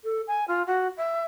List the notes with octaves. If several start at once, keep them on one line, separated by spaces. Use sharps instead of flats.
A4
G#5
F4
F#4
E5